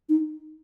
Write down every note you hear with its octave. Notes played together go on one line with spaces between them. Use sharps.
D#4